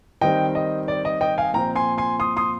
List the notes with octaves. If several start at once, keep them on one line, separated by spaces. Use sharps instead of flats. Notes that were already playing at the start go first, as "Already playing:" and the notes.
D#3 G3 C4 D#5 G5
D#5
D5
D#5
D#5 G5
F5 G#5
A#2 F3 C4 G5 A#5
G#5 C6
G#5 C6
C6 D#6
C6 D#6